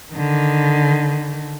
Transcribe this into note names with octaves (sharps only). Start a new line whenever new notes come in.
D3 D#3